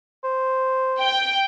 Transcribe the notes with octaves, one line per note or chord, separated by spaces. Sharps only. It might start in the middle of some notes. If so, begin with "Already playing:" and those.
C5
G5